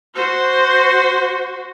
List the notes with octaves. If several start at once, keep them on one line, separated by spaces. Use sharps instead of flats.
F#4 C5